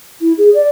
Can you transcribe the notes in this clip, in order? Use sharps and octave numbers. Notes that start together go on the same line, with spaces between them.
E4
G#4
D5